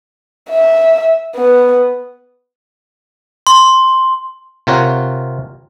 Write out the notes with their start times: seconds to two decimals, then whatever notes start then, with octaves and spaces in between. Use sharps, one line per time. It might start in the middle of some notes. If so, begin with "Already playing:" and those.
0.50 E5
1.36 B3
3.47 C6
4.67 C3 F4 A#4 C#5 F#5